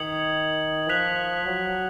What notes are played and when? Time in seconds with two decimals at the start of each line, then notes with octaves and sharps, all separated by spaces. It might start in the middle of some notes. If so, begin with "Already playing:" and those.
Already playing: D#3 D#6 G#6 C#7 F#7
0.89 F3 F#6 B6 F7
1.46 F#3